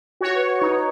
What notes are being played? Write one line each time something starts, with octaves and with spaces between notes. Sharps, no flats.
F#4 C#5
B4
D#4 C#5